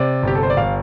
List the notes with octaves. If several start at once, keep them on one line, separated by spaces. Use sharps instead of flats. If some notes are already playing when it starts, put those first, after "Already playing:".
Already playing: C3 D5
G1 G4
A4
C5
D5
G1 F5